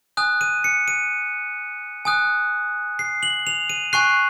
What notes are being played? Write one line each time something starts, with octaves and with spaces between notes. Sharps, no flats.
G#5 D#6 F#6
D#7
C#7
D#7
G#5 D#6 F#6
C7
F#7
F7
D#7
G#5 C#6 F#6 C7